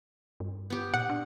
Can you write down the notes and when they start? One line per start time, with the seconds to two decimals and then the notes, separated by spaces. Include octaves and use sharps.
0.40 G2
0.70 B3 G4
0.94 A#2 F#5
1.10 D4